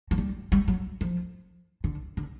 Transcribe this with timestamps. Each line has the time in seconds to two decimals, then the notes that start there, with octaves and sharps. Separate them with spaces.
0.11 F#3
0.18 G3
0.52 G3
0.68 F#3
1.01 F3
1.84 D3
2.17 D3